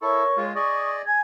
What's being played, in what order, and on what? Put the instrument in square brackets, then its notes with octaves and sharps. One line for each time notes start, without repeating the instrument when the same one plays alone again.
[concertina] E4 A4 [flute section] A#4 C#5 C#6
[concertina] G#3 F4
[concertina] G#4 D5 D#5 [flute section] C#6
[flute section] G#5 G#6